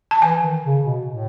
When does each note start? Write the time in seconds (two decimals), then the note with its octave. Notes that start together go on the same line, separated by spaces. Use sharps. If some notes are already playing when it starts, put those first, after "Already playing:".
0.11 A5
0.22 E3 G#5
0.43 D#3
0.64 C#3
0.85 B2
1.07 A2